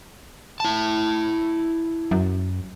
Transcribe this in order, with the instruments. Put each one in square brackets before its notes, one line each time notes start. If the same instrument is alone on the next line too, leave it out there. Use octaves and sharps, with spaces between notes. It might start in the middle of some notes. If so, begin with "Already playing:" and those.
[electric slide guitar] E4 A5
[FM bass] F#2